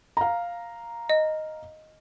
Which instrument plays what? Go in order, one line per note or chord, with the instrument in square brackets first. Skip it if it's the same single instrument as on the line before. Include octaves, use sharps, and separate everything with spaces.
[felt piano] F5 A#5
[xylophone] D#5